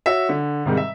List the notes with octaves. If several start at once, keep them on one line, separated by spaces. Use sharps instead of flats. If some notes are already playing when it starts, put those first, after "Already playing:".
F#4 C#5 E5
D3
G#2 C3 D#3 G3 G#3
E5